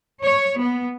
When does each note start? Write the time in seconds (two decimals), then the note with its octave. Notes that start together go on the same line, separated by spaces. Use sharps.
0.22 C#5
0.60 B3